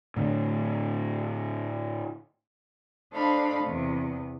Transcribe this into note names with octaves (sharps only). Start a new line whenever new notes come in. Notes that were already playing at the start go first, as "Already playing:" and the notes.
A2 D3
D4 A4 C5 D#5 F5 B5
E2 C3